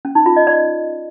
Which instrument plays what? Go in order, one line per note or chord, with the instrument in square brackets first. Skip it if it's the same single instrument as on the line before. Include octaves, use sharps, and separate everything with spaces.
[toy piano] C#4
D#4
F4
D#5
D5